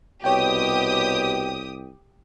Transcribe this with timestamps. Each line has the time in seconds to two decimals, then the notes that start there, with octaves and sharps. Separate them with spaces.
0.24 C2 B2 G4 C#5 G5 D#6